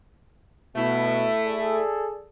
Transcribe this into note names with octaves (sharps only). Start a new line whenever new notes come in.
B2 A3 E4
G#4 A4 D5